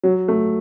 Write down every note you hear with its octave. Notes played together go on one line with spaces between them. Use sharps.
F#3
A3